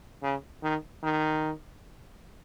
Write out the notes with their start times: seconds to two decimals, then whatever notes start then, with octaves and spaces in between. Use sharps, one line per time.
0.23 C#3
0.63 D#3
1.03 D#3